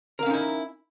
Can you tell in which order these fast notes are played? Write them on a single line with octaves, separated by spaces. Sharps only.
A#4 F5 C#4 D#4 E4